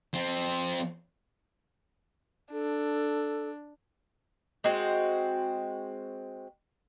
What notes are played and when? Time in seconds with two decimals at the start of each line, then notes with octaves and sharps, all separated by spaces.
0.14 F3 C4
2.52 D4 A4
4.64 G#3 C4 F#4